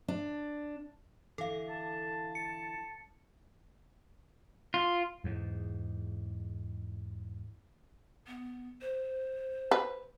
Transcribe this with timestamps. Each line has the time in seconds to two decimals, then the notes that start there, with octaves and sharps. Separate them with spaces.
0.08 D4
1.38 D3 E3 A4 F5
1.69 A5
2.35 C#7
4.74 F4
5.24 E2 G#2
8.27 B3
8.81 C5
9.71 B4